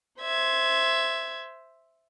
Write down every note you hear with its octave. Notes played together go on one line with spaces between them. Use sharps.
C5 E5 G#6